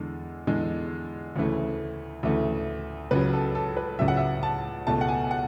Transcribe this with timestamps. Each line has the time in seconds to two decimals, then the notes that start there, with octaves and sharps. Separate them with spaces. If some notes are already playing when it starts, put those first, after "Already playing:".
Already playing: E2 D3 G#3
0.47 E2 D3 G#3
1.36 D2 C#3 E3 A3
2.23 D2 C#3 E3 A3
3.11 C#2 C#3 F#3 B4
3.33 A4
3.55 A4
3.77 B4
3.99 C#2 C#3 F#3 E5
4.08 F#5
4.17 E5
4.43 A5
4.87 C#2 B2 A3 A5
5.01 F#5
5.08 G#5
5.31 F#5